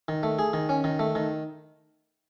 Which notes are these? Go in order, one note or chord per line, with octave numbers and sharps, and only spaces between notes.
D#3
A3
G#4
D#3
C#4
D#3
A3
D#3